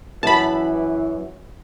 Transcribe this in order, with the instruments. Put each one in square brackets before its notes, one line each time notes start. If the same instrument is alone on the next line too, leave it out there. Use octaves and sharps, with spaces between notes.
[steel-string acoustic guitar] F#2 [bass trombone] E3 [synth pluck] A5 B5